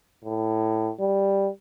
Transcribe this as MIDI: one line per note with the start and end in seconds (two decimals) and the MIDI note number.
0.25 0.90 45
1.00 1.49 55